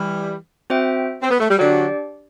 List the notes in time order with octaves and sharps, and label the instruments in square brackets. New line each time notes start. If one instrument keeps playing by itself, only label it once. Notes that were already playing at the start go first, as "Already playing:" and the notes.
Already playing: [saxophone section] E3 G3
[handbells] C4 F#4 C5 E5 G5
[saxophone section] C4
B3
A3
G3
[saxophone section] D3 F#3 [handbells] D4 G4 D5 G5